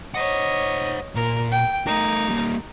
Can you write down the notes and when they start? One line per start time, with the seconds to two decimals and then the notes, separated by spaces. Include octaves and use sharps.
0.14 C5 C#5 D#5 F#5
1.15 A#2 A#4
1.51 G5
1.87 A3 D#4 A#4
2.28 G3 A#3